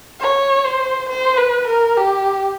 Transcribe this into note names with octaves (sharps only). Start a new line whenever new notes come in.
C#5
C5
C5
B4
A#4
G4